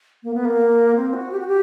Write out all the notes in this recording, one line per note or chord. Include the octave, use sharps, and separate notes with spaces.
A#3
B3
A#3
C4
F#4
G4
F#4
G4